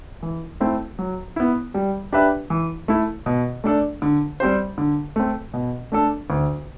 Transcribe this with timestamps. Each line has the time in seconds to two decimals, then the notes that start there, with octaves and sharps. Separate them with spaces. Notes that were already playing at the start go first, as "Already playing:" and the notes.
0.23 E3
0.60 A3 C4 E4
0.99 F#3
1.36 B3 E4
1.74 G3
2.12 D4 G4 B4 E5
2.50 E3
2.88 A3 E4
3.26 B2
3.64 A3 D4 A4 D5
4.02 D3
4.40 G3 C4 G4 C5
4.78 D3
5.16 A3 C4
5.54 B2
5.92 A3 D4 A4
6.30 D2